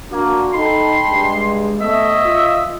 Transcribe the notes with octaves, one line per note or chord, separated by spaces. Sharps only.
A#3 D4 F#4
D#4 A4 G5 A5 B5 C6
G2 G#3
A3 B3 C#5 D#5 E5
F4